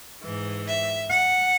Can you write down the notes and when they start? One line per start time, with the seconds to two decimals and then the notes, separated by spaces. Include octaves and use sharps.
0.21 G#2 E3
0.65 E5
1.10 F#5